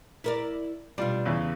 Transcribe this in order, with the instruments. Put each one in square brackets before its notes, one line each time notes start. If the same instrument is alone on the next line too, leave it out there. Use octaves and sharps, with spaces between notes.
[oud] E4 A#4 D5
[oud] B2 D4 [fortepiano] G3 F4
[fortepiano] E2 C#3